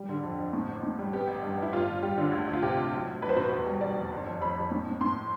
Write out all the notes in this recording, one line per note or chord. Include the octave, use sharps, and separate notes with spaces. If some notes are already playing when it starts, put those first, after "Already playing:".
Already playing: G3
D3
F2
F2
A2
A1
A2
G3
B3 G4
A1
G2
A1
E4
G1 F4
G1
G3 G4
D3
D2
D2
F4
C3 G4
D2
B1
B1
B1 B4
C5
B2 B4
E2
G3
G3 D5
F1
G1
F2
F2 B5
F2
A2
A2
A2 C6